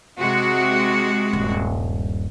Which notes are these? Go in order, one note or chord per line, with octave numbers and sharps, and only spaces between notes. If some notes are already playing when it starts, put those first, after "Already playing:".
C3 G#3 F#4
D#1 G2